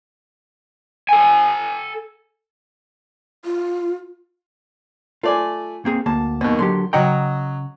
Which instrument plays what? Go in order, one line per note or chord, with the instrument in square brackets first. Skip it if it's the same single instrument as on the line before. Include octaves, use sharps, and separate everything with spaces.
[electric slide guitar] A4 G#5
[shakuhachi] F4
[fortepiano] A3 D5 G#5 [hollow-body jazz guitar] F4
[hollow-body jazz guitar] A#3 C4 G#4
[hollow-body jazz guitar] D2 A#3 [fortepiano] A5
[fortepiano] D#2 B2
[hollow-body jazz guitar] D3 F#3 G4 [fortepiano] C6
[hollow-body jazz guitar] C#3 F#5 G5 [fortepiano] F#3 D#5 A#5